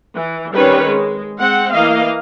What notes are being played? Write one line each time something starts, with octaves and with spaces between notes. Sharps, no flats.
E3
D#3 G3 C4 C#4 B4 C#5
G#3
G#3 C4 F#5
E3 A#3 D#5 F5